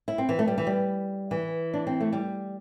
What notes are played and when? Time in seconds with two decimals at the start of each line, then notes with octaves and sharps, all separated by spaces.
0.08 E4
0.18 C4
0.29 E3
0.39 A3
0.48 G3
0.58 E3
0.67 G3
1.31 E3
1.74 D4
1.87 C4
2.00 A3
2.13 G3